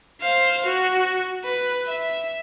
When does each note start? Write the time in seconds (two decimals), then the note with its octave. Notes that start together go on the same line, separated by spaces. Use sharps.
0.21 C5 F5
0.66 F#4
1.45 B4
1.86 E5